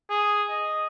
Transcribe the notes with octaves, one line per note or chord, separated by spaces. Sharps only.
G#4
D#5